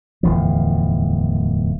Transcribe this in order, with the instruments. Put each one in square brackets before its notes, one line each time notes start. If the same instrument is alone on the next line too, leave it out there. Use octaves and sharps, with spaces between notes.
[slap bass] D1 E2 F3